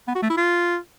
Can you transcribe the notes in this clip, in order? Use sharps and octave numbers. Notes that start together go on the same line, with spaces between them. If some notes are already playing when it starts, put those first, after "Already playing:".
B3
F#4
A3
E4
F4